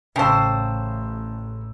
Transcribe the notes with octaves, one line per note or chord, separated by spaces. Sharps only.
A1 C#3 C5 G5 A5 E6